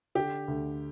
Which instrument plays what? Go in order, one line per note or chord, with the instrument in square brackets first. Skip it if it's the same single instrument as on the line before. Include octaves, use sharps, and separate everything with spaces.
[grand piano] D3 [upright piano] G4
[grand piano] D2